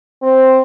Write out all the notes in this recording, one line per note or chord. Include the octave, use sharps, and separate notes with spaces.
C4